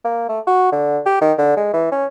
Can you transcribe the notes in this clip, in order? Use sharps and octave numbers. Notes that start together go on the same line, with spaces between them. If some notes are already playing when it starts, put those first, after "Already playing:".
A#3
A3
F#4
D3
G4
D#3
D3
G#3
E3
C#4